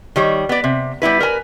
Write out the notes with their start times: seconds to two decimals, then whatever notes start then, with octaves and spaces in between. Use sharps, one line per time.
0.16 D#3 G3 C#5
0.49 B3 D5
0.64 C3
1.02 G3 B3 E4 B4
1.20 A#4 B4 G#5